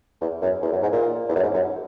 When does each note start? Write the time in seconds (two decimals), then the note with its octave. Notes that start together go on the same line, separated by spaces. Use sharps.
0.21 E2
0.42 F#2
0.62 E2
0.72 F#2
0.82 G#2
0.93 A#2
1.29 E2
1.36 F#2
1.43 G#2
1.54 F#2